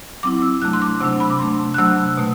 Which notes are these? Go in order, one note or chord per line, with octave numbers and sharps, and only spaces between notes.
F#3 C4 E4 D6
E6
C3 F#3 A3 D4 F#6
C6
D6
C3 F#3 A3 D4 E6
B5
D6
C3 F#3 A3 D4 C6
F#6
C3 F#3 A3 D4 E6
B2 A3